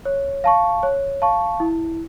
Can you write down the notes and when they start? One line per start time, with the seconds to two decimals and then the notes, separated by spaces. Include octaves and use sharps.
0.05 C#5
0.44 F5 A5 C#6
0.83 C#5
1.22 F5 A5 C#6
1.60 E4